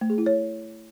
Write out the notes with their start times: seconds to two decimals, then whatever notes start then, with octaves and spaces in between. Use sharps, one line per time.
0.01 A3
0.10 G#4
0.18 E4
0.26 C#5